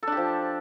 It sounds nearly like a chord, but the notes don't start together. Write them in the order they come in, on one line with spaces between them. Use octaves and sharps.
A4 D4 G4 F3